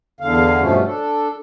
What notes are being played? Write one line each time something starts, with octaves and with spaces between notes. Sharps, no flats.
E2 D3 F5
G2 B2 F3 A3 C#4
D4 A4